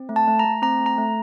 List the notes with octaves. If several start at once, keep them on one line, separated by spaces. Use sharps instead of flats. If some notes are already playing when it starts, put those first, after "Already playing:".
Already playing: C4
A3
A5
A3
A#5
A3
C4 A#5
A3
A#5
A3